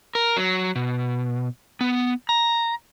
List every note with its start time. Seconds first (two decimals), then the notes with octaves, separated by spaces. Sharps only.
0.15 A#4
0.37 F#3
0.76 B2
1.81 B3
2.29 A#5